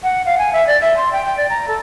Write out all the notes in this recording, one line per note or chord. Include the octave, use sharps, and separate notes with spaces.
F#5
F5
G#5
E5
D5
E5
C6
G5
G5
D5
A#5
A4